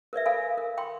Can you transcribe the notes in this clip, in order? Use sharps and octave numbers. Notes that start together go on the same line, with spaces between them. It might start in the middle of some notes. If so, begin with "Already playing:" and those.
A#4 B4 D5 E5
A4 A#4 F5 G#5 B5
A#4
G5 B5 C6